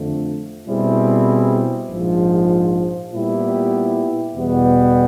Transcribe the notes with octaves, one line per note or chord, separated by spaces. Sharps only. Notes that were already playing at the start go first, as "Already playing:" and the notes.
Already playing: F2 D3 F3 A3
B2 G3 C4 E4 G#4
A#1 G#2 F3
A#2 G3 B3 E4 G4
E2 B2 G3 B3